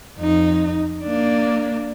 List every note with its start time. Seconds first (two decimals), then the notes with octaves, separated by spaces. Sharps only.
0.19 F2 D#4
1.04 A#3 D4